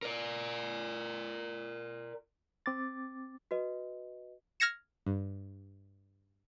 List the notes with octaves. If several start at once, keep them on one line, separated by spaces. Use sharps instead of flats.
A#4 D5
C4 D6 A6
F#4 B4 D#5
F6 G#6 A#6 C#7 E7
G2